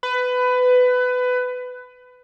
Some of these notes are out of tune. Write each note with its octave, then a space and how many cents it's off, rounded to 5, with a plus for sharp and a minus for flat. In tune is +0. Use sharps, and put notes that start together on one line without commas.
B4 +20